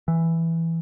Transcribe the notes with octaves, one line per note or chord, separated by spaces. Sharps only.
E3